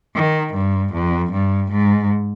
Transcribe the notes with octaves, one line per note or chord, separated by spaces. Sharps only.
D#3
G2
F2
G2
G#2